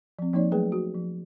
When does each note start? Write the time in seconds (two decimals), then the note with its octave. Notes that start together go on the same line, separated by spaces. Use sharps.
0.19 F3 C4
0.33 F3 A#3 D#4 C#5 D5
0.52 F#3 A3 G#4 B4 G5
0.72 F#4
0.95 F3